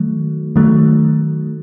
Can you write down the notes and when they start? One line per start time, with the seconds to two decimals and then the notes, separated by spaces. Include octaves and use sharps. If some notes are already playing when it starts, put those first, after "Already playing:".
Already playing: D#3 F#3 A3
0.56 D#3 F#3 A3